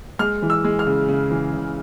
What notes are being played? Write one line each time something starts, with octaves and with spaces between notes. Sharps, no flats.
G#3 F6
E3
E6
G#3
F6
C#3
C#3
E3
C#3